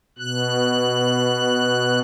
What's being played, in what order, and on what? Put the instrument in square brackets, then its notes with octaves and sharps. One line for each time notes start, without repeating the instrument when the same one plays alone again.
[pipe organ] B2 F#6